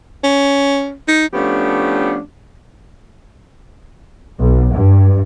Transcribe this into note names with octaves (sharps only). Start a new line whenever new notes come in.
C#4
D#4
F3 A3 B3 C#4 D4 G4
B1
G2